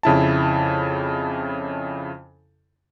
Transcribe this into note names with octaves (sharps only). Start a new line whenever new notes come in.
F2 C#3 E4 A5